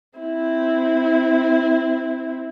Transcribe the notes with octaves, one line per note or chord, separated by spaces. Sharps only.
C4 E4